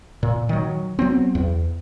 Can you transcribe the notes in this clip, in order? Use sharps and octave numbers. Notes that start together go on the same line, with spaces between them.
A#2
D#3 F#3
F#3 B3 C4
E2